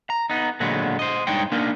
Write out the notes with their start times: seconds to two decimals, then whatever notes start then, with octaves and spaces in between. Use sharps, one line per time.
0.10 A#5
0.30 B3 D#4
0.60 A#2 D3 F#3 G#3 B3
0.99 C5 D#5
1.27 G2 G#3 D#4 G#4 C#5 G5
1.52 A#3 D4 D#4 A#4 G#5